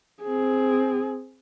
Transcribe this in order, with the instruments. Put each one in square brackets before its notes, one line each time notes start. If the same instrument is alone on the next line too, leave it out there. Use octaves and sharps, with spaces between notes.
[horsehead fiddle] C4 G#4